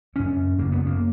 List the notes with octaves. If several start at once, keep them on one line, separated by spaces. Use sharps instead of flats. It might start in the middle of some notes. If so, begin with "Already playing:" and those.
F#2 C#3 C#4
F#2 C#3 A#3
B3
A#3